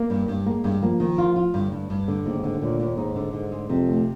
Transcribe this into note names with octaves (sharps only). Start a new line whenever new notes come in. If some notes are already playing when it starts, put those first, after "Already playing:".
Already playing: A#3
G2
G2
G#3 A#3
G2
F3 A#3
D#3
F4
F4
G2 D3
G2
G2
D3
D#2 G#2
D3
D#2 A#2
D#2
G#2 D#4
D3
G#2 D3
G#3
F2 C3
D2